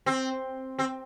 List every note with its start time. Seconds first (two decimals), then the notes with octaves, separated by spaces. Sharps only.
0.06 C4
0.79 C4